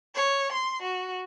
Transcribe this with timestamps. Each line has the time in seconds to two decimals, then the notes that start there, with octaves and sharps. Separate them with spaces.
0.15 C#5
0.53 C6
0.83 F#4